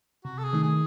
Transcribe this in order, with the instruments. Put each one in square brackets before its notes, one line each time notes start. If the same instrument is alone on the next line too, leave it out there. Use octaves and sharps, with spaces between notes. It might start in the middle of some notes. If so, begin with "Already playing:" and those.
[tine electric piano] C3 [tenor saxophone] F#4
[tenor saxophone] A4
G#4
[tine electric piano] D#3 A3 D#4
[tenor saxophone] G#4